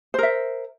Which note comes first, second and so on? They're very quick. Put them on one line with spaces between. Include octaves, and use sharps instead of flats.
C5 A#4 E5